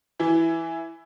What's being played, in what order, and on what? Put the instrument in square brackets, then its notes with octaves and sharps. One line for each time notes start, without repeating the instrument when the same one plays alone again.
[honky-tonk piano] E3 E4